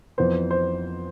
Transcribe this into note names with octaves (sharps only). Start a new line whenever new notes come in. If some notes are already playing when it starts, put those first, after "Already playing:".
F2 E3 B3 C5
C5